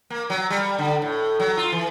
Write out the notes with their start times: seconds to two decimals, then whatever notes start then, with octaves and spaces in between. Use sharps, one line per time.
0.10 A#3
0.30 F#3
0.50 G3
0.78 D3
1.02 A2
1.40 F#3
1.57 F4
1.72 E3